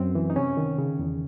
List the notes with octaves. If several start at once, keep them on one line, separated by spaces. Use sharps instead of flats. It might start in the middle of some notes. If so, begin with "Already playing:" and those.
Already playing: F#2 C4
E3
D#4
C3 C#4
D#3
C#3
E2